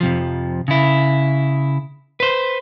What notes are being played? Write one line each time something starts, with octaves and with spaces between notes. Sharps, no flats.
F2 C3 F3
C#3 E4
B4 C5